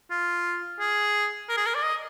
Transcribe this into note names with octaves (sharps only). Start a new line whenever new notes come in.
F4
G#4
A#4
G#4
A#4
D5
D#5